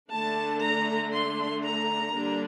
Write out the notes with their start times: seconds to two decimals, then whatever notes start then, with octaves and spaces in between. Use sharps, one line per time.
0.12 D3 A3 D4 A5
0.62 A#5
1.12 C6
1.63 A#5
2.14 D3 G3 A#3 D4